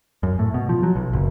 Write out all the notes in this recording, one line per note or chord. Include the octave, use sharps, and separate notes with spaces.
F#2
A2
B2
F3
F#3
B1
F#1